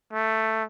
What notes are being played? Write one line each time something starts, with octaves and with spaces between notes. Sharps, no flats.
A3